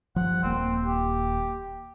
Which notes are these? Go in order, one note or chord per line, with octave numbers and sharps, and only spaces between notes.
G2 F3 F#5
D#1 A#3 C4
G4